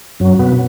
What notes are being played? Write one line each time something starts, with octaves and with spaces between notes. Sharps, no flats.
F#2 F#3
B2 B3